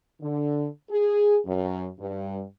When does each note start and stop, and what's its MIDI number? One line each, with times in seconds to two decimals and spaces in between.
0.21 0.67 50
0.90 1.38 68
1.45 1.88 42
1.99 2.43 43